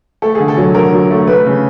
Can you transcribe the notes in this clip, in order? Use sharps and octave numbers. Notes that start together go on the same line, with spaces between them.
A3 A4
D3 G#4
A4
F#3
D3 A#4
F#3
A3
A3 B4
C#3